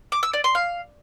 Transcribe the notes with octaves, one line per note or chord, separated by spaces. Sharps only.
D6
E6
D5
C6
F5